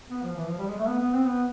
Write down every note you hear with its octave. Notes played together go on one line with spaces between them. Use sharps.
B3
F3
E3
F3
G3
G#3
A3
B3
B3
C4
B3